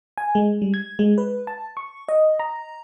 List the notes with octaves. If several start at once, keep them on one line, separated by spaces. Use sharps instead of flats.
G#5
G#3
G3
G#6
G#3
B4
A5
C#6
D#5
A#5